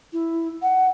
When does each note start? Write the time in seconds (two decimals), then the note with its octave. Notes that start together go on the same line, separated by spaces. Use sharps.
0.12 E4
0.62 F#5